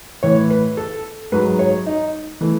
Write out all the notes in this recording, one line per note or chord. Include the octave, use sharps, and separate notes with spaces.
A2 E3 C#5
B4
A4
G#2 F#3 B4
C#5
D#4
E3 A3